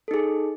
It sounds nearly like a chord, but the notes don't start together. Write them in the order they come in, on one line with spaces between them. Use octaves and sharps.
A4 D#4 G#4